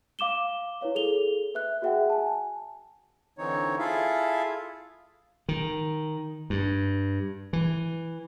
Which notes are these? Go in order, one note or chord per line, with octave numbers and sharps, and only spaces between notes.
F5 D6 E7 G7
E4 B4 C#5 F5
G#4 A4 F7 G7
B4 E5 F#6
F#4 G#4 E5 F#5 G5
G#5 A5
D3 E3 C4 D#4 C#5
E4 F4 G#4 A4 E5 F5
D#3
G2
E3